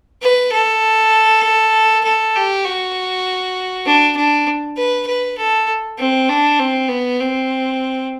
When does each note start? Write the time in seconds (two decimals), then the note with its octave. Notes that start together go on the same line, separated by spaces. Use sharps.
0.22 B4
0.53 A4
2.04 A4
2.35 G4
2.65 F#4
3.86 D4
4.16 D4
4.77 B4
5.07 B4
5.38 A4
5.98 C4
6.29 D4
6.59 C4
6.88 B3
7.20 C4